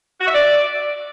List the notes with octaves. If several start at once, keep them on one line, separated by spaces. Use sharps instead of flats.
F#4
E5
D5